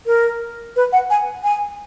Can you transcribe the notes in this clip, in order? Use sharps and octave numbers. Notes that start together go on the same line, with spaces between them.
A#4
B4
F#5
G#5
G#5